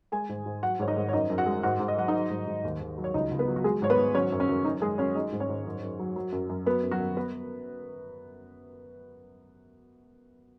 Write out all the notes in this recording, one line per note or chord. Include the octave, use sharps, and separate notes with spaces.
G#3 G#4 G#5
G#2
G#2
F#3 F#4 F#5
G#2 C#5
D#4 D#5
G#2
C#5
F#2 D#4 D#5
F#2
F#4 F#5
G#3
G#2 F#4 F#5
G#2
D#5
F#3 F#5
D#4 D#5
F#3
G#2
G#2
D#2
D#2
F#3
C#5
C#2 D#4 D#5
C#2
B3 B4
F#3
F#4
G#3 G#4
G#2 C#5
B3 B4
G#2
F#3 C#4 C#5
F#2
C#4
F#2
F#2 D#4
F#2 G#3 G#4
F#3 C#4 C#5
G#3 D#4 D#5
G#2
C#4 C#5
G#2
F#2
F#2
F#3
F#3
F#2
F#2
F#3 B3 B4
F#2
F#3 F#4
F#2
B3 B4